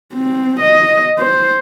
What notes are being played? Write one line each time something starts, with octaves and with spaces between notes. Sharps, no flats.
C4
D#5
C5